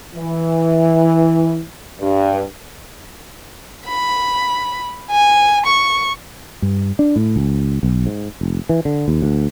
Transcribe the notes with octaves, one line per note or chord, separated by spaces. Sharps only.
E3
G2
B5
G#5
C#6
G2
D4
A2
C#2
B1
G#2
F1
E3
D3
D#2
D2